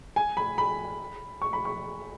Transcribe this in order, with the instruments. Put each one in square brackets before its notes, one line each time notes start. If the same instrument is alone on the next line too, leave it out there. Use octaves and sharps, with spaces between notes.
[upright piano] G#5
B5
B5
C#6
B5
C#6